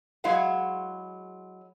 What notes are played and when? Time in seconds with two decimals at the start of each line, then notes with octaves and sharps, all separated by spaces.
0.24 F#3 G#3 E4 G#4 F5 F#5